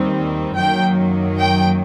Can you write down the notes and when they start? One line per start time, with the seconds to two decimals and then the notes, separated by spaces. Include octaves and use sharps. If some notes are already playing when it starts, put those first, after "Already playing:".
Already playing: D#2 D#3 G3 C4
0.56 F#2 D#3 F#3 A#3 G5
1.38 G5